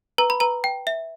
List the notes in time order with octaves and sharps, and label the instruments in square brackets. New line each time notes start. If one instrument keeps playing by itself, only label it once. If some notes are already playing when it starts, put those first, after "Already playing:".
[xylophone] B4 A#5
B5
B4 A#5
G5
E5